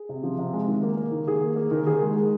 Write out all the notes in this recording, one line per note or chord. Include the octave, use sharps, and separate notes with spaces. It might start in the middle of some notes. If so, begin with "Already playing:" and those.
Already playing: G#4
C3
F3
C3
G#3
D#3
A#3
A#3
D#3
D#3 G#4
A#3
A#3
D#3
A#4
D#3 G#4
G#3
G#3